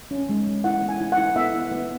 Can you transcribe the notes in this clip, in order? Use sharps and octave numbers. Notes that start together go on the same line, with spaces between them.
C#4
G#3
G#3
E4 F#5
B3
G#5
E4
F#5
E4
B3 E5
E4
B3